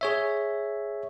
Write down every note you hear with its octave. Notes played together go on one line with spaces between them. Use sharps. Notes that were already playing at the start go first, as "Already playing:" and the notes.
G#4 C#5 E5